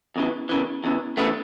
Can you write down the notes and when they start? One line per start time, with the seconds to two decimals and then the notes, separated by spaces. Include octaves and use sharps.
0.16 E2 C#3 E3
0.49 E2 C#3 E3
0.84 E2 C#3 E3
1.17 E2 C#3 E3 A3 B3